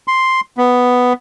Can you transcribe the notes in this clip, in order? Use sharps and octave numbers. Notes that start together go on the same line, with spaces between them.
C6
B3